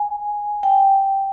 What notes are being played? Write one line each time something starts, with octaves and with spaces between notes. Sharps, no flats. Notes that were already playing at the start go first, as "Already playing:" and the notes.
Already playing: G#5
G5